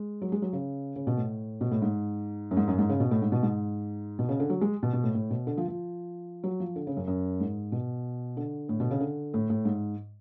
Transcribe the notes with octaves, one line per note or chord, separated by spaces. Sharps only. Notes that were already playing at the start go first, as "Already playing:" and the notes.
Already playing: G#3
F#3
G#3
F#3
C#3
C#3
B2
A2
B2
A2
G#2
F#2
G#2
F#2
G#2
C#3
B2
A2
G#2
B2
G#2
B2
C#3
D3
F#3
G#3
B2
B2
A2
A2
B2
D3
F3
F3
F#3
F3
D3
C#3
F#2
F#2
G#2
B2
D3
A2
B2
C#3
D3
A2
A2
G#2